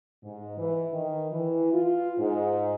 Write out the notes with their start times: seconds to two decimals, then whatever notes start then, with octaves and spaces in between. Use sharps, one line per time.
0.23 G#2
0.58 E3
0.92 D#3
1.31 E3
1.73 F4
2.18 G#2